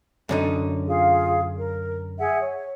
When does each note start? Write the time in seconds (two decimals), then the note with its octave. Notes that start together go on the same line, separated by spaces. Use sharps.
0.29 F#2 D3 D#4
0.87 F4 G#4 F5
1.57 A#4
2.19 G#4 E5 F#5
2.41 C#5